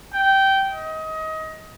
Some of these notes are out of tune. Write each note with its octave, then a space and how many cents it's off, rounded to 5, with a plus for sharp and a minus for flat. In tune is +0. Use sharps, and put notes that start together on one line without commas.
G5 -15
D#5 +25